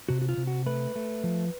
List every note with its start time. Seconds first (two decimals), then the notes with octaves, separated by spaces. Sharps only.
0.09 C3 F#4
0.22 F#4
0.29 F4
0.37 C3
0.47 F#4
0.66 A3 B4
0.96 A3
1.24 F3